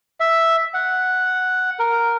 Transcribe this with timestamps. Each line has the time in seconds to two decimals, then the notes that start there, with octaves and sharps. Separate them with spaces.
0.20 E5
0.74 F#5
1.79 A#4